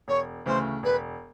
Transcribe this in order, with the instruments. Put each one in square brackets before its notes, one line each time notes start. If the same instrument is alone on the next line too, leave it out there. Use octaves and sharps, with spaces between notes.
[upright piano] E1 [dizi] C#5
[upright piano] D2 C#3 E3 A3 [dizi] C5
[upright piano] E1 [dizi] B4